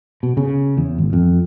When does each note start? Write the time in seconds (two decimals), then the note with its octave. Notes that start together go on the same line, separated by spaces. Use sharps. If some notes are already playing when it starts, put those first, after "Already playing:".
0.23 B2
0.37 C#3
0.77 E2
0.98 G#1
1.13 F2